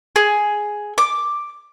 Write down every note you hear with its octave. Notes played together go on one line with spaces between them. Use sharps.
G#4
D6